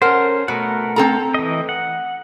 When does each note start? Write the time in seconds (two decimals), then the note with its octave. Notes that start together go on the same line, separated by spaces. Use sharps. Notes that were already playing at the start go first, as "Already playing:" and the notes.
0.02 C#4 A4 A#4 C5 F#5
0.48 B2 A3 A#4 F#5
0.96 C4 A4 A#5
1.34 E3 D#5
1.69 F#5